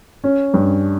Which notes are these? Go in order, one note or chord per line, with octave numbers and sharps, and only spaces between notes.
C#4
G2